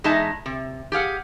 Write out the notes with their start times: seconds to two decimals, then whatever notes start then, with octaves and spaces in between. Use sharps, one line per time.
0.04 E2 G#3 D#4 D#5 E5 A5
0.46 C3
0.92 G4 G#4 F5 F#5